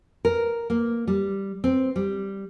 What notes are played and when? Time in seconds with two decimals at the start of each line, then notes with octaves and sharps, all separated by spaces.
0.25 A#4
0.70 A#3
1.07 G3
1.64 C4
1.96 G3